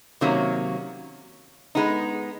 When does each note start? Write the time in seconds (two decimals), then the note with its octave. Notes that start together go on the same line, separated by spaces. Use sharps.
0.21 C3 D#3 F#3 A#3 C#4
1.75 G#3 B3 D#4